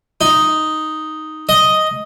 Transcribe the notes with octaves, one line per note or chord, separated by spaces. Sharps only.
D#4
D#5